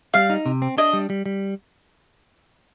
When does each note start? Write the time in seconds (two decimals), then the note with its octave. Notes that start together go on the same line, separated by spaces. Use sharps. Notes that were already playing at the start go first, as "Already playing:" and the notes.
0.14 G3 F5
0.30 D#4
0.46 C3
0.62 C4
0.78 D4 D#5
0.93 G3
1.10 G3
1.26 G3